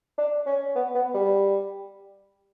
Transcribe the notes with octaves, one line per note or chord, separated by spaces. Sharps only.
D4
C#4
B3
B3
G3